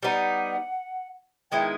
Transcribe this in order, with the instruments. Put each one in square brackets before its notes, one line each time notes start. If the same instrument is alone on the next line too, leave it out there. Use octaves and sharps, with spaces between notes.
[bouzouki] G3 B3 D#4 [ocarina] F#5
[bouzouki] D#3 G#3 B3 E4 [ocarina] G5